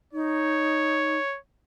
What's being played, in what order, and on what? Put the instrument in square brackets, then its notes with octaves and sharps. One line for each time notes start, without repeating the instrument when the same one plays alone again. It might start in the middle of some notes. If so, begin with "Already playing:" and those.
[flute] D#4 [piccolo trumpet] C#5